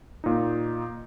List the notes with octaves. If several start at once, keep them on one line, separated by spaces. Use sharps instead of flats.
A#2 D#4